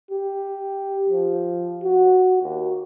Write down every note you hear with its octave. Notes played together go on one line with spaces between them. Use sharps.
G4
F3
F#4
D#2